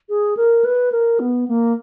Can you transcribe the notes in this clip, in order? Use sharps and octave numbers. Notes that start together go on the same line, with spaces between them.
G#4
A#4
B4
A#4
B3
A#3